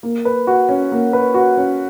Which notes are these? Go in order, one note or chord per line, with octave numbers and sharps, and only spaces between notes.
A#3
B4
F#4
C#4
A#3
B4
F#4
C#4